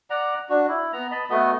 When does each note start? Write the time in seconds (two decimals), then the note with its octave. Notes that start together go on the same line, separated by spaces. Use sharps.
0.10 D5 F#5 A#5
0.50 D4 F#4
0.68 E4
0.93 B3 A#5
1.11 D#5 A5 B5
1.30 A3 B3 F#4 D#5